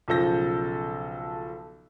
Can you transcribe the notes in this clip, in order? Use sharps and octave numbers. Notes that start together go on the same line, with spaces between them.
B1 C#3 F3 A4 G6 A#6